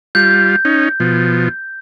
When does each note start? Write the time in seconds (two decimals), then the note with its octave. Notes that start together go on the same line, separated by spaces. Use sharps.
0.15 G3 F4 G6
0.65 C#4 D#4
1.00 B2 F3